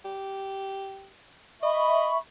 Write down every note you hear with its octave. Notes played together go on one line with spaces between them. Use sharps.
G4
D#5 E5 B5 C#6